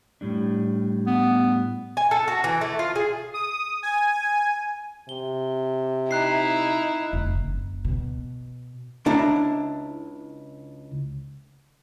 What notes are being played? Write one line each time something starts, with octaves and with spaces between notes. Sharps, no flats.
A2 G3 D4
B3
G#5
A4
F#4
E3
A3
F4
G#4
D#6
G#5
C3 G7
D#4 E4 A#5 F#6 C7
F1
F#1
B2
C#2 D4 E4 A#5